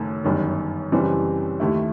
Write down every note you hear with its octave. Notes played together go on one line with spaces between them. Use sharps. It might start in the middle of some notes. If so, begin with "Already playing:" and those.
Already playing: F#1 F#2 D#3 A3
G1 F#2 D#3
F#1 F#2 E3 G3 C4
D#2 D#3 A3 E4